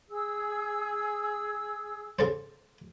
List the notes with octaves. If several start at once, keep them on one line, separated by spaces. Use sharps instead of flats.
G#4 E6
C#3 A4 C5